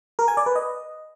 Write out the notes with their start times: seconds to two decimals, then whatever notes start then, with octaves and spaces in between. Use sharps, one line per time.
0.19 A#4
0.28 G#5
0.37 D5
0.46 B4
0.56 D#5